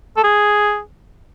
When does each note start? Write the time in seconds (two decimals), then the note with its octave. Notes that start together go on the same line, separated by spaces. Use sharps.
0.17 A4
0.24 G#4